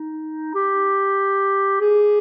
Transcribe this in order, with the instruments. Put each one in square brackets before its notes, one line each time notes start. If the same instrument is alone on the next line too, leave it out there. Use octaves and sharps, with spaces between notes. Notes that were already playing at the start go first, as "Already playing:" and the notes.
Already playing: [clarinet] D#4
G4
G#4